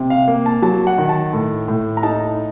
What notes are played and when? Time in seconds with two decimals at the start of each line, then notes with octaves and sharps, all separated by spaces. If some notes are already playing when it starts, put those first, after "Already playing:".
Already playing: C3
0.10 F5
0.28 A#3
0.46 A5
0.62 F#3 A5
0.87 F#5
0.98 D#3
1.09 A5
1.33 A2
1.68 A2
1.97 A#5
2.03 D#4 A5